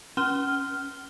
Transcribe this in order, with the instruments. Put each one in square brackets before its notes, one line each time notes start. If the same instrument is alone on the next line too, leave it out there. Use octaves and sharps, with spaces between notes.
[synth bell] C#4 F6 G7